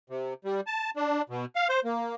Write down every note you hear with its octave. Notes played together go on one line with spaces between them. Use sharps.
C3
G3
A5
D4
B2
F5
C5
A#3